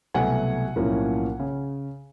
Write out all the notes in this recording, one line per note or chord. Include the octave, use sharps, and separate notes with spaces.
C2 B2 F#3 A3 F#5 G#5
B1 A2 F3 A#3 C#4
C#3